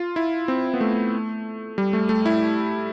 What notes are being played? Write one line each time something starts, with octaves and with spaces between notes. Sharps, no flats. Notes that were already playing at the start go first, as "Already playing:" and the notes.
Already playing: F4
E4
C4
B3
A3
G3
A3
A3
E4